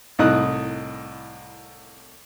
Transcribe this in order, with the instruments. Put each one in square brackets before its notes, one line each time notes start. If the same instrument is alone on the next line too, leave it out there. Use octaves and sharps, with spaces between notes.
[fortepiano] C2 A2 D#4 D#6 F#6